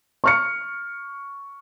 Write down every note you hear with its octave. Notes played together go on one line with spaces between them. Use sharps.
C#6 F6 C#7